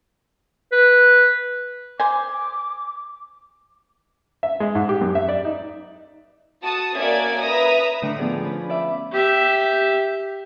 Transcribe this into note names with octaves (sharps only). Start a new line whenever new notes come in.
B4
C5 G#5 D6
E5
G#3
G#2
G4
F#2
E5
D5
D#4
F#4 A5 D#6
A#3 C#4 F#4 D5 E5 G#6
B4 E5 A#5 D#6
A2 D3 D#3 A3 D4 D6
F3 B3 G#4 D5
C#4 B4
D5 E5 D6
G4 E5